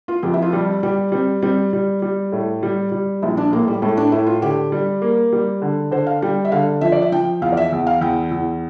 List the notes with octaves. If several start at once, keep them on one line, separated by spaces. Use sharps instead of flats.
F4
F2 G4
E4
F4
G3 G4
G3 G4
G3 C4
G3 C4
G3
G3
A2
G3
G3
A#1 E4
D4
A2 A#3
G3
A2 A3
D4
A2 E4
F4
D3 G4
G3
A#3
G3
D3
D3 C5
F5
G3 G5
E5
D3 F5
F3 E5
D5
E5
F3 G5
E2 F5
D5
E5
E2
F5
E2 G5
E2